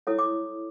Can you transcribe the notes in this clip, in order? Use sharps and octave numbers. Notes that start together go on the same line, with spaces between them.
E4 A4 C#5 D#6
D6